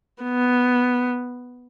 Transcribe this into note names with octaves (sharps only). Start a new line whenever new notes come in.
B3